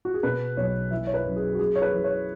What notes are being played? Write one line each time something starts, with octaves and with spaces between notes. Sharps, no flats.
F#4
G#4
B2 B4
B1 C#5
E3 E5
C#5
B4
F#2
G#4
F#4
G#3 G#4
C#5
B4
E3
C#5